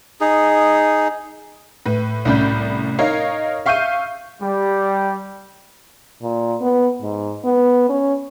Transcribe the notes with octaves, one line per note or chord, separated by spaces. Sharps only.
D#4 G#4
A2 B4
C2 A2 C#4 D5 B5 G6
D#4 A#4 C#5 F5
E5 F5 C#6 G6 C7 D#7
G3
A#2
B3
G#2
B3
C#4